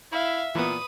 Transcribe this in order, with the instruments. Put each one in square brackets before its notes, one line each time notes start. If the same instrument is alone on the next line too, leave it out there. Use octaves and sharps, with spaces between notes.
[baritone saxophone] E4 [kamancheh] E5 [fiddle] F5
[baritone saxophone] A#2 [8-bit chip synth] E3 B3 [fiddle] B4 D#6